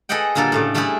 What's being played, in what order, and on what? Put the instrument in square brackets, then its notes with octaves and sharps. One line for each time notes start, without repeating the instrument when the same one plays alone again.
[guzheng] G#4 A4 B4 D#5 F#5 G5
A#2 D3 G3 A#3 A4
A2 C#3 A3
G3 A3 D4 E4 G4 G#4